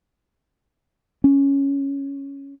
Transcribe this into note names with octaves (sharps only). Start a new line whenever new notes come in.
C#4